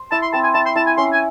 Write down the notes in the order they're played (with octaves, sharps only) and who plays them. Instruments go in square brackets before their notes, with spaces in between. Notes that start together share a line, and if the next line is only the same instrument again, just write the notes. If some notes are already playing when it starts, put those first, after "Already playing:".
Already playing: [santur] C5
[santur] E4 [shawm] A5
[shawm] C6
[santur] C4 [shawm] A5
[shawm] G#5
[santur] E4 [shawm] A5
[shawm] C6
[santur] E4 [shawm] A5
[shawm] G#5
[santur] C#4 [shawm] C6
[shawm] G#5